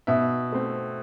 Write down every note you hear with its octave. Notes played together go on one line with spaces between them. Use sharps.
B2 E5
A3 C4